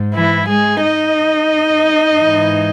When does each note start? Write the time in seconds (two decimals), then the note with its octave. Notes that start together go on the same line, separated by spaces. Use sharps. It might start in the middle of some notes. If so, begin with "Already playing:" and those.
Already playing: G#2
0.14 E3 E4
0.48 G#3 G#4
0.82 D#4 D#5
2.20 G#2 E3